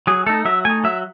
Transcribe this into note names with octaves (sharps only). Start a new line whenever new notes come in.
F#3 G#4
A3 D#4 A4
F#3 E5
A3 D#4 G#5
F#3 E5